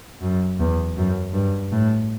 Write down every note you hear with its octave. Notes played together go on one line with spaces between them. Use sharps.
F#2
E2
F#2
G2
A2